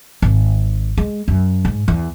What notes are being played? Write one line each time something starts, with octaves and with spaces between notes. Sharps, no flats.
G#1
G#3
F#2
G#2
E2